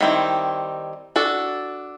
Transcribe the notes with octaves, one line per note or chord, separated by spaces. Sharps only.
D#3 G3 C4 E4
D4 F#4 A4